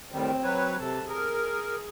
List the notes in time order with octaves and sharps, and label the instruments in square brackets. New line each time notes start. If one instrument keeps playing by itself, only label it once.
[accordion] A2 D#3 G3 [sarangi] C4
[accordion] F#3 B4 C#5
[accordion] C3 [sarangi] A4
[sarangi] G#4 [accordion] A#4